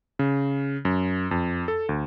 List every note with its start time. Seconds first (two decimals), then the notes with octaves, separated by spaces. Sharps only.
0.19 C#3
0.85 F#2
1.31 F2
1.68 A4
1.89 D2